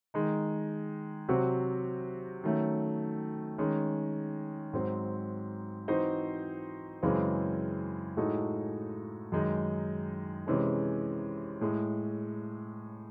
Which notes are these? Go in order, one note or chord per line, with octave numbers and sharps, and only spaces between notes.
D#3 G#3 D#4
C3 F#3 C4 F#4
D#3 F#3 A3 C#4
D#3 G#3 C#4
G#2 F#3 C4
E3 C4 D#4 F#4 C5
F#2 C#3 E3 G#3 C4
A2 G#3 D#4 F#4 A4
F#2 D#3 G#3 D#4
C3 E3 G#3 C#4 G#4
A2 G#3